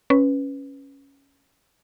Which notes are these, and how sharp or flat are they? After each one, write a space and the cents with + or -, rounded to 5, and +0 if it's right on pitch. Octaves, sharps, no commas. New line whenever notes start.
C#4 +0 B4 +0